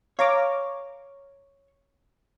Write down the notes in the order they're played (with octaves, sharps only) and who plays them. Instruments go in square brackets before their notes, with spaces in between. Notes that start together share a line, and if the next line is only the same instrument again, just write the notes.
[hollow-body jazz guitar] C#5 [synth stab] F5 A#5 D6